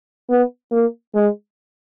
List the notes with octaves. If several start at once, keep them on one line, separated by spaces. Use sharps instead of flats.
B3
A#3
G#3